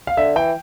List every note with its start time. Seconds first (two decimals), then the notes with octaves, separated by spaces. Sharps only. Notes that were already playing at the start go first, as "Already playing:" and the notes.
0.07 F5
0.17 D3 E5
0.36 E3 G5